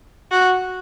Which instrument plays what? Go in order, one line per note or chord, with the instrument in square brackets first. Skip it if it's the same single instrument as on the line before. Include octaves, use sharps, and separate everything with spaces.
[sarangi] F#4